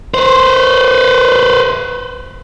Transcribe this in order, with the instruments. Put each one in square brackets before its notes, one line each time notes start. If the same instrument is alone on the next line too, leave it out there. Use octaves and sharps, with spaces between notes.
[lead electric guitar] B4 C5